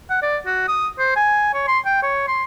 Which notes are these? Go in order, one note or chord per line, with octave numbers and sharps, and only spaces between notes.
F#5
D5
F#4
D#6
C5
G#5
C#5
C6
G5
C#5
C6